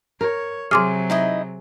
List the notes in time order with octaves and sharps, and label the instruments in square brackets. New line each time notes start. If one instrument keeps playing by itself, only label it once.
[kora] A#4 [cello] C#5
[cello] C3 F#3 [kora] G#4 [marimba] C6 D6 F6
[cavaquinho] D#4 E4 D#5